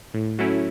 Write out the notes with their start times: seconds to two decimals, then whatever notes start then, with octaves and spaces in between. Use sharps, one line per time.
0.14 A2
0.39 F#3 A3 C#4 E4